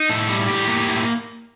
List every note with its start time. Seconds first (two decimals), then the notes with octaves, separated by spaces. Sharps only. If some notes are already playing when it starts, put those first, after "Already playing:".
Already playing: D#4
0.09 A2 A4
0.29 G3
0.49 A2 G4
0.67 A#3
0.87 A2